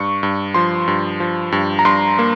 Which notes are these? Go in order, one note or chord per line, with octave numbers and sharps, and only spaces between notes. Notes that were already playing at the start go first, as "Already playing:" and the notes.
Already playing: G2 C#6
G2
F3 C6
G2
F3
G2
A#5
G2 C6
A#3